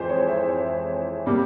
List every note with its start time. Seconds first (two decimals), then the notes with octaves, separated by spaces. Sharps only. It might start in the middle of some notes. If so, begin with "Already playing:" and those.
Already playing: F2 E3 G#3 G#4 C5
0.09 C#5
0.28 E5
0.49 C#5
1.26 C3 G3 A#3